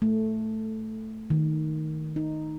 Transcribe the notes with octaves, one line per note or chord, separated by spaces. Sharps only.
A3
D#3
D#4